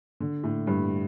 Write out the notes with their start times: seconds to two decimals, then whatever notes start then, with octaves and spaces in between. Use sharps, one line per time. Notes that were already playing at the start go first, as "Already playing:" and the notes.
0.20 D3
0.43 A2
0.67 G2